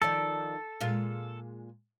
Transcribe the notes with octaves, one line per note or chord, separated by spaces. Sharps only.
D#3 F3 A4 D5
A#2 G#3 F4